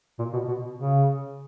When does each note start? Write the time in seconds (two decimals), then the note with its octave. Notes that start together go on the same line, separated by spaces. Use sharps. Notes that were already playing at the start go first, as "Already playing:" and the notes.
0.19 A#2
0.33 B2
0.48 B2
0.77 C#3